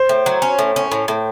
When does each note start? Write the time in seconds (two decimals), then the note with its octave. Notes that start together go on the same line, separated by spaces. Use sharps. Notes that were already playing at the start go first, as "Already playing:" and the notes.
Already playing: C5
0.09 A2
0.26 F#3
0.42 C#4
0.59 A2
0.76 C#4
0.92 A2
1.08 A2